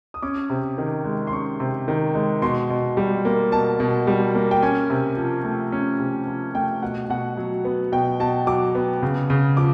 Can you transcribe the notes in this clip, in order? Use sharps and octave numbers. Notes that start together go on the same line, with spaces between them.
D#6
C#4 D6
C3
D#3
G#3
C6
C#4 C#6
C3
D#3
G#3
B2 C6
B2
G3
A#3
B2 A5
B2
G3
A#3
G5
C#4 G#5
C3
F3
A3
C#4
C3
F3
A3 G5
B2 F#5
B2 F#5
F#3
B3
B2 G5
B2 A5
F#3 D6
B3
C#3
C#3
F3 D6